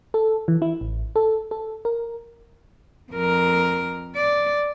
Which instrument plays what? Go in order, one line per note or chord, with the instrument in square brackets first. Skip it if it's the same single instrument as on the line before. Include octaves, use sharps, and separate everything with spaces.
[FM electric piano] A4
E3
E4
A1
A4
A4
A#4
[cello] F2 A#4
D5